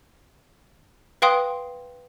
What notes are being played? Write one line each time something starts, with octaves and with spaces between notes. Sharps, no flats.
B4 F5 G5 C6 D#6